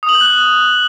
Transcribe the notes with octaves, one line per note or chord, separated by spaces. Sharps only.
D#6
F#7
G6
F#6